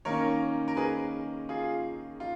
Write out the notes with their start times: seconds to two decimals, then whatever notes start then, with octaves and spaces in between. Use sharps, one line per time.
0.05 D#3 A#3 C#4 A#4 C#5
0.68 A#4
0.76 G#4 B4
1.49 F4 G#4
2.20 F4